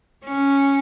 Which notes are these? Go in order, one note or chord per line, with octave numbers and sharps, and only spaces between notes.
C#4